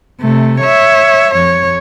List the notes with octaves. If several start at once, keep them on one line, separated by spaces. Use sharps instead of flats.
C3 A3
C#5 E5
F2 C#5